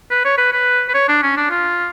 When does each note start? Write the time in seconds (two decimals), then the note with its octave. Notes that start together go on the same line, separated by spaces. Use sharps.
0.10 B4
0.25 C#5
0.37 B4
0.52 B4
0.89 B4
0.94 C#5
1.08 D4
1.22 C#4
1.37 D4
1.50 F4